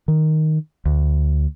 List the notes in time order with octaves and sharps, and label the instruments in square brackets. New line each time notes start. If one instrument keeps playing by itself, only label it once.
[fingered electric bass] D#3
D2